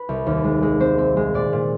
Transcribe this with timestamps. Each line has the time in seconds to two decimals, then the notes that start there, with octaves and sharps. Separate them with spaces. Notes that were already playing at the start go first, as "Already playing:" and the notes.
Already playing: B4
0.09 C2
0.26 D#2
0.44 G#3
0.63 G#3
0.80 C4 C5
0.98 C4
1.17 G#3
1.34 A#2 D5
1.53 A#2